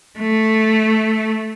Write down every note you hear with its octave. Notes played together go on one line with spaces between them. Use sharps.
A3